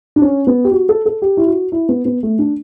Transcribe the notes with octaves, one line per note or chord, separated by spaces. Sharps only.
D4
C#4
B3
G4
F#4
A4
A4
G4
E4
F#4
E4
B3
B3
A3
D4